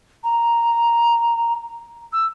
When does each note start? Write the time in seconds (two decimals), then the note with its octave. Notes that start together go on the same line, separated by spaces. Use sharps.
0.24 A#5
2.12 E6